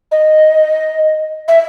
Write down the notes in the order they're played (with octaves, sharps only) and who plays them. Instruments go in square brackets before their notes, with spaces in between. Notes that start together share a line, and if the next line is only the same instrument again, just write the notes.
[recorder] D#5
E5